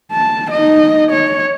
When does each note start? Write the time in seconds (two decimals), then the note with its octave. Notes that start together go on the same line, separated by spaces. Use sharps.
0.12 A5
0.51 D#4 D#5
1.12 C#5